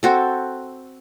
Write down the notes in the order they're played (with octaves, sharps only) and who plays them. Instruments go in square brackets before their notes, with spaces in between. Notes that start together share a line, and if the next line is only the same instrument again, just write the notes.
[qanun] C4 F#4 A4